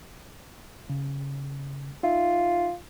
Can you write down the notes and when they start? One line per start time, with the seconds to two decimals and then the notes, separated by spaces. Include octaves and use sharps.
0.90 C#3
2.03 D#4 F4 E5